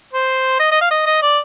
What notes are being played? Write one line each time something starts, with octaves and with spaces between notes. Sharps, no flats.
C5
D#5
D#5
F5
D#5
D#5
D5